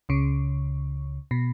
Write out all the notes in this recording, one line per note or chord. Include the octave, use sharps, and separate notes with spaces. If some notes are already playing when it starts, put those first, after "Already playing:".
C#2 C#3
B2